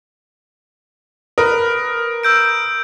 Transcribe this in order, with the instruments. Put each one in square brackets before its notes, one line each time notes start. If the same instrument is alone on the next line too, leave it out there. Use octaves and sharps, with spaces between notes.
[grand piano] A#4 B4 [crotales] D#6
[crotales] E6 G6 D7